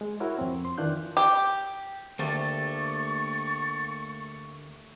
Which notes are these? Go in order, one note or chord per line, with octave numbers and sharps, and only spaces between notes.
G#3
E4 F#4 A#4 C#5
F2 C4
C6
D#3 E3 D4 F4 F#6 G6
G4
D2 A3 A#3 G4 C#6 A6